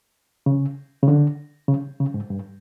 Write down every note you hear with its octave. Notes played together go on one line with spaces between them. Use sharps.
C#3
C#3
D3
C#3
C#3
G#2
G2